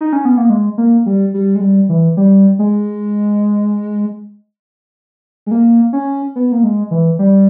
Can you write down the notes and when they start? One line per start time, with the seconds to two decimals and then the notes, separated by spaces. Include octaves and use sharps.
0.01 D#4
0.13 C#4
0.25 B3
0.37 A#3
0.50 G#3
0.78 A#3
1.06 G3
1.34 G3
1.55 G#3
1.61 G3
1.89 E3
2.17 G3
2.59 G#3
5.46 G#3
5.51 A#3
5.93 C#4
6.36 B3
6.52 A#3
6.64 G#3
6.91 E3
7.19 G3